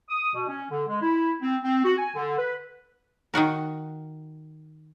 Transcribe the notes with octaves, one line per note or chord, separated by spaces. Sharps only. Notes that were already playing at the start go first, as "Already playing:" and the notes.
D#6
B2
C#4
D3
G#3
E4
C4
C4
F#4
G#5
D3
B4
D#3 D#4 F#4 A#4